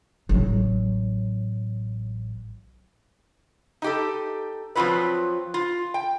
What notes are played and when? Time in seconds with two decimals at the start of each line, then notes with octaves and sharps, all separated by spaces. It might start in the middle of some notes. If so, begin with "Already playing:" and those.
0.29 A1 F#3
3.82 D#4 G4 A4
4.75 F3 F#3 C4 F4 A4 B4
5.54 F4
5.94 G5